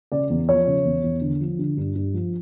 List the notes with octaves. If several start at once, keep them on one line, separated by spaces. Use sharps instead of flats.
C#3 D5
E2
F3 C#5
C#3
E2
E2
D3
F3
D3
G2
G2
F3